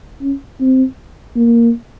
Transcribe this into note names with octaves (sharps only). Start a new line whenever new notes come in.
C#4
C4
A#3